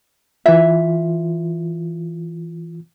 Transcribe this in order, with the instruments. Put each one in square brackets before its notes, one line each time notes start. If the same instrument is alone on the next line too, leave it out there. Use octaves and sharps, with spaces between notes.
[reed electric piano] E3 F4 [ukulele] E5